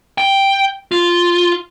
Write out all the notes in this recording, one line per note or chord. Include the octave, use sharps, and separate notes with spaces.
G5
F4